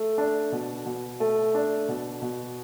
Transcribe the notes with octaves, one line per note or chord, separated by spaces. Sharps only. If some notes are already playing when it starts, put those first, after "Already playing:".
Already playing: A3
D4
B2
B2
A3
D4
B2
B2